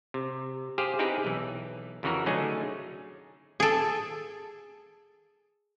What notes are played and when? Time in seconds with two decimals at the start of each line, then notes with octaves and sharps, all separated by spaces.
0.14 C3
0.78 G4 G#4 C5 F5
0.99 C4 D#4 E4 G4 G#4 B4
1.25 B1 E3
2.03 F2 C#3 E3 F#4 A#4
2.26 D3 F#3 A3 C#4 D#4 G#4
3.60 G#4 A4